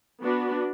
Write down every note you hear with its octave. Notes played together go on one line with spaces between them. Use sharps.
B3 D4 F#4 B4